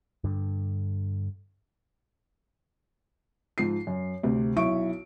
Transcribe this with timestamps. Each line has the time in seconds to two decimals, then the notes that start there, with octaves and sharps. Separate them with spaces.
0.24 G2 D3
3.58 G#2 F3 C7
3.87 F#2
4.23 D2 C3
4.56 B1 E4 C#6 D7